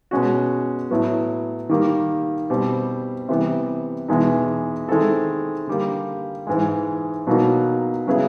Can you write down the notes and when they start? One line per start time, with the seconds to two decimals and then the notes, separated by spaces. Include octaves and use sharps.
0.11 B2 G#3 C#4 F#4
0.91 A2 F#3 B3
1.69 D#3 G3 A#3
2.50 B2 G3 C4
3.29 C3 E3 G3 B3
4.08 E2 B2 G#3 B3 D#4
4.88 D#3 G#3 C4 E4 A4
5.68 D3 G3 A#3
6.47 G#2 E3 G#3
7.27 B2 F#3 A#3 D#4 F#4
8.07 C#3 F#3 B3 E4 G#4